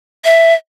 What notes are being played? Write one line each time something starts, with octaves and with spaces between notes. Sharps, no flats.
E5